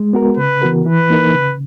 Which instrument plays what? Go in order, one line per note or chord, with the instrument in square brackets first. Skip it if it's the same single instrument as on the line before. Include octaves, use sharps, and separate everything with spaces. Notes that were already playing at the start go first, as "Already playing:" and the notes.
Already playing: [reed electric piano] G#3
B3 F#4 A#4
[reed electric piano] C#3 [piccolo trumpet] B4
[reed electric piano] E3 B3 F#4 A#4
[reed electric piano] E3 [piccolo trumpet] B4
[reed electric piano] A#3 D#4 A#4
C#3